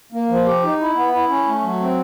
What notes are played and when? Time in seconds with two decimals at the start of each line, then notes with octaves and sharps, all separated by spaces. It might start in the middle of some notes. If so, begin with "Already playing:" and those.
0.12 A#3
0.29 F3
0.45 G4
0.63 D#4
0.80 E4
0.95 B3
1.12 E4
1.29 C#4
1.46 A3
1.62 F#3
1.79 C4